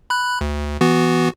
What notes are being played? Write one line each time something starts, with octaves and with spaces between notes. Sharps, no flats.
B5 F#6
D2
E3 B3 F#4